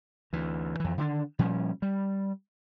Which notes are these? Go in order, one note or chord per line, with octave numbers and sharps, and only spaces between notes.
D2 E3
F2 E3
D3 D#3 B3 D4
A#2 F3 G3 C#4
G3